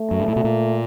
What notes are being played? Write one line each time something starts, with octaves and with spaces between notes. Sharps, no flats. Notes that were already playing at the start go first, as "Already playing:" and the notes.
Already playing: A3
F#2
G2
A2
B2
A#2